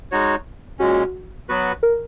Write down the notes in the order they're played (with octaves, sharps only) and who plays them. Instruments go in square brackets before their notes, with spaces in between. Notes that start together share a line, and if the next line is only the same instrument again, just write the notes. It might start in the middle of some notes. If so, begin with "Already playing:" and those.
[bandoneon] G#3 D#4 F#4 C#5
[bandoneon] A#2 G#3 C#4 [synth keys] F#4
[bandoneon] F#3 B3 F#4 B4
[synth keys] A#4